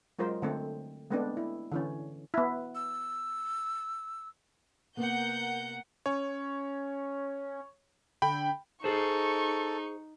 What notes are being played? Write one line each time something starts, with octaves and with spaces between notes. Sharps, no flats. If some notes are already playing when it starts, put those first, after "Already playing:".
F#3 G#3 F4 A#4 C5
D3 A3 C4
G#3 A3 B3 C4 D4
E4
D3 E3 C#4
B3 E4
E6
C3 A#3 B3 A#4 F#5 G6
C#4 C#5
D3 G5 B5
D#4 G#4 A4 C5 C#6